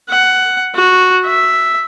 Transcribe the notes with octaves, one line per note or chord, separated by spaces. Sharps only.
F#5
F#4
E5